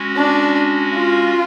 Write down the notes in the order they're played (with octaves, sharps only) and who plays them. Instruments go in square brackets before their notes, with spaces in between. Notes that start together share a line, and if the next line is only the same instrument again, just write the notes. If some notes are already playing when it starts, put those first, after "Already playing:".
Already playing: [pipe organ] G#3 C#4 F#4
[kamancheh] D4
F4